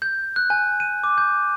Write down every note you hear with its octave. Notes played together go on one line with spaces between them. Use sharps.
G6
F#6
G#5
D#7
D6
G6